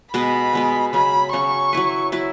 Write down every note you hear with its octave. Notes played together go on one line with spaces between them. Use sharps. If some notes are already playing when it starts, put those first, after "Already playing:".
B2 G#3 B3 B5
B2 G#3 B3
C#3 F#3 C#4 B5
C#3 F#3 C#4 C#6
F#3 E4 B4
F#3 E4 B4